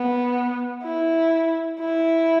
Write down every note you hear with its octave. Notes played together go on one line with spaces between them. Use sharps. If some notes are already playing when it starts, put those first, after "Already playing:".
Already playing: B3
E4
E4